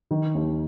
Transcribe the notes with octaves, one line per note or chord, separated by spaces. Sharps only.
D#3
D#2